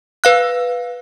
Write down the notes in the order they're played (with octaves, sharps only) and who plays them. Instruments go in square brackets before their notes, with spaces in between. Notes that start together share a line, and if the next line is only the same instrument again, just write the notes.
[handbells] B4 F5 F#6